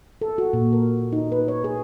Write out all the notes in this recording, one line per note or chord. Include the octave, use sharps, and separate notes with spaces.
A4
F#4
A#2
A#4
D#4
B4
C#5
G#4